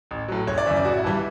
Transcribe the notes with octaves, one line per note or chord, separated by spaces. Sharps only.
A1
A2 F#3
F#1 C#5
D5
F#2 C#3 E3 E5
D5
A1 F#4
E4
G2 E3 G3